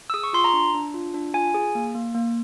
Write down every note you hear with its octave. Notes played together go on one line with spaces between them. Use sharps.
E6
G#4 D#6
C#6
F4 C6
A#5
D4
D4
F4
D4
F4 G#5
G#4
A#3
A#3
A#3